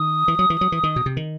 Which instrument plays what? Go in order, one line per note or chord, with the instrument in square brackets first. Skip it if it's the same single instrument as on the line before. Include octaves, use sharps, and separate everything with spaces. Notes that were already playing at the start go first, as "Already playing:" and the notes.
Already playing: [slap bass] D#3 [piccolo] D#6
[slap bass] E3
F#3
E3
F#3
E3
D#3
B2
C3
D#3